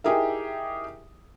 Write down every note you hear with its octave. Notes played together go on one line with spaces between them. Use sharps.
D#4 E4 G4 G#4 A#4 E5